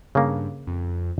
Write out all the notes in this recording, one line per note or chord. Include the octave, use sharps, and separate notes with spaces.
G2 C#3 A#3
F2